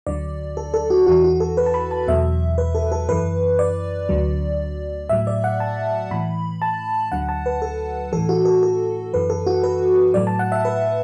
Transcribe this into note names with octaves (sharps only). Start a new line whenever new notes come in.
D2 D3 F#3 D5
A4
A4
F#4
E2 E3 F#4
F#4
A4
B4
A5
B5
A5
E2 B2 F#3 E5
B4
A4
A4
F#2 E3 B4
D5
D2 D3 F#3
A2 F#3 E5
D5
F#5
A5
A2 E3 B5
A5
D2 D3 F#3 F#5
A5
B4
A4
A2 E3 A4
F#4
A4
A4
F#2 E3 B4
A4
F#4
B4
A2 F#3 D5
A5
F#5
E5
B4